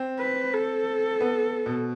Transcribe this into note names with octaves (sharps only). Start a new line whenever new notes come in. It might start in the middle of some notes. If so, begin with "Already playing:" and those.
Already playing: C4
B4
A4
B3
B2